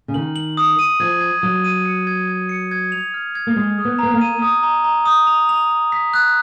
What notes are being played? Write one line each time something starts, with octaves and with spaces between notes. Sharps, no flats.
C#3
D#3 F#7
F#7
D#6
D#7
F3 G#6
G#6
F#3 D#6
D#7
C#7
G#6
G#6
C#7
G#6
F7
F6
G#6
A#3
G#3 D#6
D#6
B3
B3 A#5
A#3
D#7
D#6
A#5
A#5
D#6
F7
F7
F7
B6
F#6